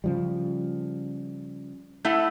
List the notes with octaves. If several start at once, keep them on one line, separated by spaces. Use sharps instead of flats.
C#3 F3 G3
A3 E4 F#5